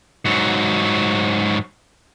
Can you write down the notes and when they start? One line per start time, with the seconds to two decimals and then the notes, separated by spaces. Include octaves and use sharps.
0.25 G#2 F#3